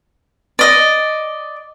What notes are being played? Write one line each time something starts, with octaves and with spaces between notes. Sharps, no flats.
D5 D#5